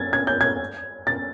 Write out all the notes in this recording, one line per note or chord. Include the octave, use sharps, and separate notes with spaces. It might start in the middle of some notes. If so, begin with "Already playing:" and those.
Already playing: G#6 A6
G#6
G6
G#6
A6